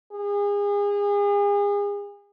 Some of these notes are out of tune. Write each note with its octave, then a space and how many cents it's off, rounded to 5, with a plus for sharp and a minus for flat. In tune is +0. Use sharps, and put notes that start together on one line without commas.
G#4 -35